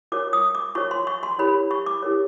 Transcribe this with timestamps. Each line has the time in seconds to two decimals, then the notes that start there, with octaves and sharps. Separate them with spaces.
0.12 F4 A#4 C#5 D6
0.33 D#6
0.55 D6
0.75 F4 A#4 C#5 C#6
0.91 C6
1.07 C#6
1.23 C6
1.39 E4 G4 A#4 C#5 B5
1.71 C#6
1.86 D6
2.02 E4 G4 A#4 C#5